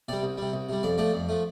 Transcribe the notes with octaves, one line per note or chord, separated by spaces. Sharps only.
C3 G3 D5
C2
C3 G3
C2
C3 G3
F2 D5
F3 A3 D5
F2
F3 A3